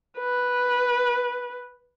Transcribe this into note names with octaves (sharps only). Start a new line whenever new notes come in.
B4